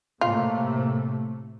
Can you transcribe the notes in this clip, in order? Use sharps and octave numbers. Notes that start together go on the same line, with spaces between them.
A2 C3 A3 A#3 F4